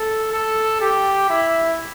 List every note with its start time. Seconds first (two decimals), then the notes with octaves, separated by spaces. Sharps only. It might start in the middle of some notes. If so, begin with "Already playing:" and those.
Already playing: A4
0.32 A4
0.81 G4
1.30 E4